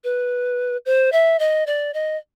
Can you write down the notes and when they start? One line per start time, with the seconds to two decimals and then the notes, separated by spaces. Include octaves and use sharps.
0.04 B4
0.86 C5
1.12 E5
1.39 D#5
1.67 D5
1.94 D#5